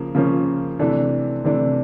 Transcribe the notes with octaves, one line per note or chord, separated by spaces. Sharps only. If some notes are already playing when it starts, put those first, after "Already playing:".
Already playing: C#3 F3 A#3
C#3 F3 A#3 C#4
C3 E3 A3 D4
C3 E3 A3 D4